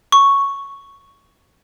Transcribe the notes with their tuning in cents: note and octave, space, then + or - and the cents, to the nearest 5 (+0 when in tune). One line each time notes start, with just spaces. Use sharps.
C#6 +0